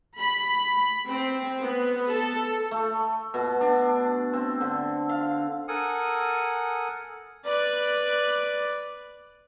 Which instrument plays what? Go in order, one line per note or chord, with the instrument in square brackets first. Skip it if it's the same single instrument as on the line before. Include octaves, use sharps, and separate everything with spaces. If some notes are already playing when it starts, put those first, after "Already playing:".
[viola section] B5
C4
B3
A4
[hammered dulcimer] A3
B2
D4
C4
D3
F5
[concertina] A4 A#4 F#5 G#5 D#6
[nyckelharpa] B4 D5